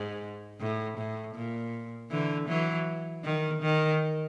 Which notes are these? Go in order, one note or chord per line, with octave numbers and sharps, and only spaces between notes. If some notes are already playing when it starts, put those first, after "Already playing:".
Already playing: G#2
A2
A2
A#2
D3 E3
E3 F#3
D#3
D#3